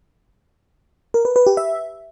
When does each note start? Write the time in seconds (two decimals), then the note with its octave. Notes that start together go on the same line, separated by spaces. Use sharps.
1.14 A#4
1.25 B4
1.36 B4
1.47 G4
1.57 E5